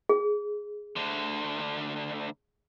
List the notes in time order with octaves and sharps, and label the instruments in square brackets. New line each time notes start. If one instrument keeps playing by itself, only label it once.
[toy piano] G#4
[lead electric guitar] D2 D3